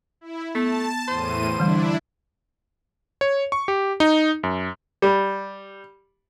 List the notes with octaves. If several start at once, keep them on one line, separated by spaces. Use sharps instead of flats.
E4
A3 B3 A5
E2 A2 C5 D#7
D3 E3 G3 D4 E4
C#5
C#6
G4
D#4
F#2
G3